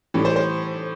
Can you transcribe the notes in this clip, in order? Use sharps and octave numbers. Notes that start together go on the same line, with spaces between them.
A2 E3 G3
C5
C5